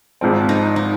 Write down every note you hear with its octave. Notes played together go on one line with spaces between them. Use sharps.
G#1 G#2 F3 C4
D#4
D#4